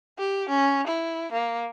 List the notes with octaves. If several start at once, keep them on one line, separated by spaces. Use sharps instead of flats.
G4
C#4
E4
A#3